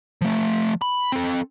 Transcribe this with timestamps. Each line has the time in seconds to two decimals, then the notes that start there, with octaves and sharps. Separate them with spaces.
0.21 F3 A3
0.82 B5
1.12 C4 A4